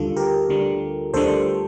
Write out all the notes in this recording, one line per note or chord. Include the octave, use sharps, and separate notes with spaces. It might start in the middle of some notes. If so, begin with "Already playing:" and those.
Already playing: D2 D3 G3 F4 A4
G4 A#4
D2 D3 G3
D2 D3 G3 A4 C5